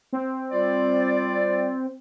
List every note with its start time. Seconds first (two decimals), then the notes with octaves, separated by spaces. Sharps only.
0.13 C4
0.51 G3 F4 D5